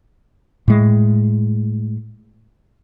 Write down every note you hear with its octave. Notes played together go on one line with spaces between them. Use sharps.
A2 G#3